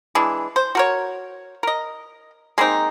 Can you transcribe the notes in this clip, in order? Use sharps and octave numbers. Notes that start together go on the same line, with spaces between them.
E3 G#3 D4
C5
F#4 A#4 C#5
A#4 D#5
G#3 A#3 C4 D#4